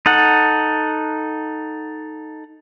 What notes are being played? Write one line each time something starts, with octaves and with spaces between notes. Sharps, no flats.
D#4 A4 F#5